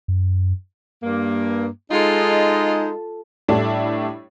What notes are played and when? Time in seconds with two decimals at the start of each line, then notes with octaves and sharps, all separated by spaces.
0.08 F#2
1.03 G2 A#3
1.91 G#3 D#4 F4 A4
3.49 A2 G3 A3 D4 E4